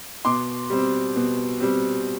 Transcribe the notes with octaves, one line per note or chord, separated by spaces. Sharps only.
B2 C6 D6
G3 C4
B2
G3 C4